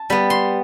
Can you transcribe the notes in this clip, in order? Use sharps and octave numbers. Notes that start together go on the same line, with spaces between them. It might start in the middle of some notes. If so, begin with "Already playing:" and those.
Already playing: A5
G3 B3 B5
C6